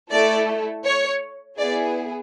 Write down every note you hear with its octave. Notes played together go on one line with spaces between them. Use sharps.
A3 E4 A4 D5
C#5
B3 E4 G#4 D5